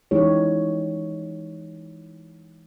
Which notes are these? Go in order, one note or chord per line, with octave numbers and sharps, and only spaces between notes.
E3 G#3 D#4 G4 C#5